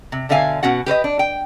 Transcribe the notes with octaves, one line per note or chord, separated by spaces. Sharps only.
C3
B2 D3 E5 F5 G#5
B2 C#4 F#4 F#5
G4 B4 C5 D#5
D4
G5